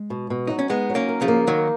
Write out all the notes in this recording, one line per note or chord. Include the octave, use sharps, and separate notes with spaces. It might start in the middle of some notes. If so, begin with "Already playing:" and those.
Already playing: G#3
B2
B2
F#3 D#4
C#4
G#3 B3 D#4
F#3
A#3 C#4
A#4
C#3 F3
A#3
D#3 F#3 D#4